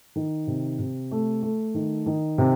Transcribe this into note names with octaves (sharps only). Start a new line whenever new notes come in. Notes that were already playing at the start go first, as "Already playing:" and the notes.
D#3
C3
C3
A3
A3
D#3
D#3
C3